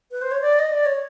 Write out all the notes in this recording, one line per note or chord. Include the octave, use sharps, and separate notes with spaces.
B4
C5
C#5
D5
D#5
D5
C#5